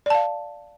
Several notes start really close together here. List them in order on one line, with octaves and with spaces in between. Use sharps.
D5 A5 F5